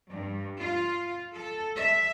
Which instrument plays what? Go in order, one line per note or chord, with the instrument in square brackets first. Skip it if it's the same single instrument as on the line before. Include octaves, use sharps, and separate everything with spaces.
[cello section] G2
F4
A4
E5